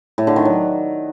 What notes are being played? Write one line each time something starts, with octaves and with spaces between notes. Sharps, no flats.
A2
D3
D#3
F#3